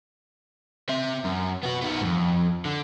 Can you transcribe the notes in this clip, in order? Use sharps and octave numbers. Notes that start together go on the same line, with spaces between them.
C4 E5
F#2
B3 F#4
D#3 B3
F2 G#2
D3